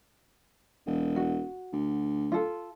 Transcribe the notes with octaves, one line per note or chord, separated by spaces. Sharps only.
E1
F#4
D2
F4 A4